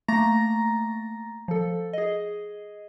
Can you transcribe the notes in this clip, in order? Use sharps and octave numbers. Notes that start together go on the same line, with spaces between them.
A3 A#3 A#5 A6 A#6
F3 A4
G#4 D#5